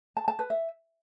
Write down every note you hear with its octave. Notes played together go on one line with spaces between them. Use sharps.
A5
A5
B4
E5